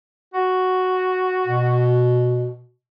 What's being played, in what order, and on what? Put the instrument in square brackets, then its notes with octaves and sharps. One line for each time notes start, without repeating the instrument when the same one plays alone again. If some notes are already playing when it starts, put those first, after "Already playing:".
[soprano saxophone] F#4
[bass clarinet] B2